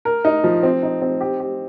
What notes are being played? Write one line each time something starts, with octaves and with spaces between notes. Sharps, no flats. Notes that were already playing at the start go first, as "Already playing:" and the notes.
A#4
D#4
F3
C4
D#4
C4
G4
G4